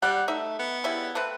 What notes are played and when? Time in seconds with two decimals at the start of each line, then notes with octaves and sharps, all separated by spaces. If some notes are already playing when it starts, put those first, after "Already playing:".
0.02 G3 D5 F#5
0.28 A3 D#4 E5
0.59 B3
0.84 C#3 G3 E4
1.15 A3 C4 B4